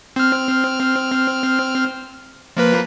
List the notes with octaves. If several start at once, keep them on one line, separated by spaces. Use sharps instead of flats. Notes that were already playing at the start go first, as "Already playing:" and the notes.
C4 F6
F3 A#3 B4